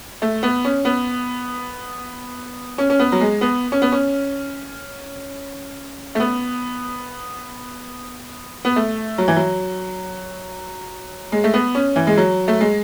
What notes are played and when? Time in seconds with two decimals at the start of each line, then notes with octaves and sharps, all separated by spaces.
0.22 A3
0.43 B3
0.65 C#4
0.85 B3
2.78 C#4
2.90 C#4
2.99 B3
3.12 F#3
3.21 G#3
3.41 B3
3.72 C#4
3.82 B3
3.92 C#4
6.15 A3
6.20 B3
8.65 B3
8.76 A3
9.18 F#3
9.28 E3
9.36 F#3
11.32 G#3
11.44 A3
11.54 B3
11.75 C#4
11.96 E3
12.07 G#3
12.17 F#3
12.48 A3
12.61 G#3